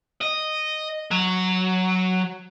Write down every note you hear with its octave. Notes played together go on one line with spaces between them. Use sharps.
D#5
F#3